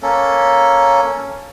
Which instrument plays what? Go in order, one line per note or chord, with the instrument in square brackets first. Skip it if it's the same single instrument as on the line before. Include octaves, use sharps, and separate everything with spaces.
[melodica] A#3 C#4 A4